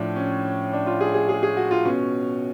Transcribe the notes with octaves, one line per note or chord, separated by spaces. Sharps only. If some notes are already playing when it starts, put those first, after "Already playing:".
Already playing: A2 F3 D4
C#4
D4
F4
G#4
G#4
G#4
G#4
F#4
F4
B2 C#4